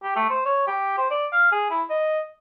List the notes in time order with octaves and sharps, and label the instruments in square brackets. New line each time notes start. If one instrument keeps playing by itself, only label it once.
[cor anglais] G4
A3
C5
C#5
G4
C5
D5
F5
G#4
E4
D#5